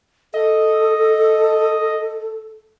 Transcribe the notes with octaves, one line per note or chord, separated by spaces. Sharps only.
A4 D#5